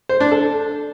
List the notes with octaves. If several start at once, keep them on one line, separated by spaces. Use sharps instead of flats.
C5
D4
A4